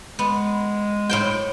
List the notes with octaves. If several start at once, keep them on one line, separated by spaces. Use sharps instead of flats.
G#3 B3
A2 C5 G5